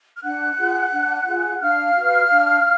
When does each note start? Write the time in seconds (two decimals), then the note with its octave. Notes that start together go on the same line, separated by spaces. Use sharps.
0.15 F6
0.23 D4 F#5 F#6
0.57 F4 G#4
0.92 D4
1.26 F4 G#4
1.60 D4 F5 F6
1.95 F#4
2.00 B4
2.30 D4